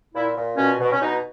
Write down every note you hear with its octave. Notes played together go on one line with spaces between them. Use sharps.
A#2 E4
A#2
B2 C#4
B2
C#4
B2 D#4